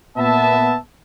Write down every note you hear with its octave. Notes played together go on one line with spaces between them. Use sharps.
A#2 B3 E5 A5